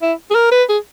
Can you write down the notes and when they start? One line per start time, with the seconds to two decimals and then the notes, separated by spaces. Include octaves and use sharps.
0.02 E4
0.31 G#4
0.35 A#4
0.52 B4
0.69 G#4